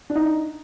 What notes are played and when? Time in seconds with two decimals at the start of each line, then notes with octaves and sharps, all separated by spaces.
0.10 D4
0.15 D#4